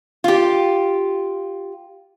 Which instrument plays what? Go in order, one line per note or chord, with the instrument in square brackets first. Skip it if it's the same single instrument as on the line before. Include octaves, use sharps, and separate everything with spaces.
[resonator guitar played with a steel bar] F4 G4